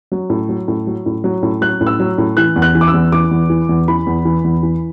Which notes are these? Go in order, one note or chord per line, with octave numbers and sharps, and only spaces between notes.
F#3
A2
F#3
A2
F#3
A2
F#3
A2
F#3 F#6
A2
E6
F#3
A2
E3 F#6
E2
F#6
E3
D6
E6
E2
E3 D6
E2
E3
E2
E3 B5
E2
E3
E2
E3